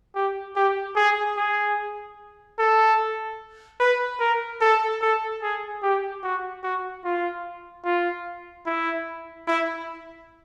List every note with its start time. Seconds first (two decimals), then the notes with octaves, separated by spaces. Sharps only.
0.15 G4
0.56 G4
0.96 G#4
1.37 G#4
2.59 A4
3.80 B4
4.20 A#4
4.61 A4
5.02 A4
5.42 G#4
5.83 G4
6.23 F#4
6.64 F#4
7.04 F4
7.85 F4
8.66 E4
9.47 E4